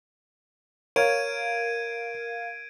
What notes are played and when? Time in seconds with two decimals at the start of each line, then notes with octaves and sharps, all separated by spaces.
0.96 A#4 C#5 F5 G#6 D7 D#7